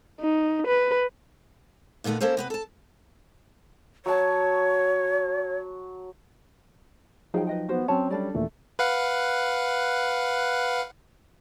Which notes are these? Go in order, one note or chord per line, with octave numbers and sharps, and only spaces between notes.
D#4
B4
A#2 D3 D#3 A3 B3
A#3 C#4 A4 A#4 C5
C3 B3 B4
A4 A5
F#3 C#5 A5
F3 F#3 D#4 G#4 G5
B4 D#5 G5
B3 F#4 C5
F#3 C4 C#4 C#5 A5
G3 D4 A4 D5
D#2 A#2 E3 A3
B4 F5 F#5